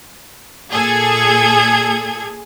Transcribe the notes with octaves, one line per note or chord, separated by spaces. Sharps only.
A#2 G#4 A4 G#6